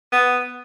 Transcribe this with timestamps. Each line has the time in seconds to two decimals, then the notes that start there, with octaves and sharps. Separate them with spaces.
0.12 B3